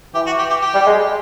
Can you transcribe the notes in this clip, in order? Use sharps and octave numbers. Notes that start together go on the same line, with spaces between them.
E3 G4
F#4
G4
G4
G4
G3
G#3